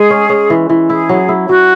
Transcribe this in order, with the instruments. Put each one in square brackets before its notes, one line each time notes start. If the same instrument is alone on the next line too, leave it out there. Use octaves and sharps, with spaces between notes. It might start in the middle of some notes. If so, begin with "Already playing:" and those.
Already playing: [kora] G#3 [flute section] G#4
[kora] C#4
C#4
E3
E3
[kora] E4 [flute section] G#4
[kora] F#3
E4
[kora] F#3 [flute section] F#4